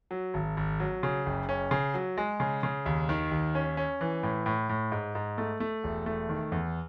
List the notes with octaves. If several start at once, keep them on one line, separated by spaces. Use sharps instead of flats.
F#3
G#1
G#1
F#3
C#3
F#1
C#4
C#3
F#3
G#3
C#3
C#3
D#2
D#3
D#2
C#4
C#4
E3
A2
A2
A2
G#2
G#2
A3
A3
E1
A3
D#3
E2